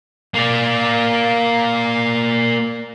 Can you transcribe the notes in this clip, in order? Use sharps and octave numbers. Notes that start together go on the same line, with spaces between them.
A#3 D5